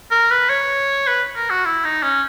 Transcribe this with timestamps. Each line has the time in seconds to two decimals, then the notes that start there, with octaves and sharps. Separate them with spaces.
0.11 A#4
0.31 B4
0.50 C#5
1.07 B4
1.36 A#4
1.50 F#4
1.66 E4
1.84 D#4
2.03 C#4